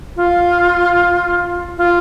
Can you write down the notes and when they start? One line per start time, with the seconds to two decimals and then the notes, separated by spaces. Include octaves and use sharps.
0.16 F4
1.78 F4